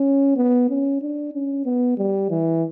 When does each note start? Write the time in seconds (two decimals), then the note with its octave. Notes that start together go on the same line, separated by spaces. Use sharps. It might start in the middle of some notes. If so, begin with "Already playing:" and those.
Already playing: C#4
0.36 B3
0.69 C#4
1.01 D4
1.33 C#4
1.65 B3
1.98 G3
2.30 E3